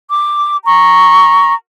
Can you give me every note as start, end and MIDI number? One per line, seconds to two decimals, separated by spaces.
0.10 0.56 86
0.65 1.54 82
0.65 1.54 85